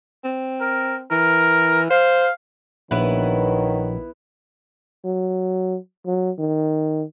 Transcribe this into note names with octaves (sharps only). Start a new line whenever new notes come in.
C4
A#4
E3 A#4
C5 F5
A#1 D#3 F#3 B3 E4 B4
F#3
F#3
D#3